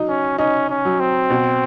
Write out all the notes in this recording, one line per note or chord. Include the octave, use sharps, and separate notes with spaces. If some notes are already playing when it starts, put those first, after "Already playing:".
Already playing: F#3 D#4
C#4
C#4 D#4
C#4
F#3
C4
B2